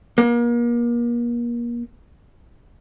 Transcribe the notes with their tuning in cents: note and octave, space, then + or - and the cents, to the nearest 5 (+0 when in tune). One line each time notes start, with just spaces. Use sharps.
A#3 +35